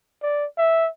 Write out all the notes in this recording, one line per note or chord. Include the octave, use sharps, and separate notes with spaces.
D5
E5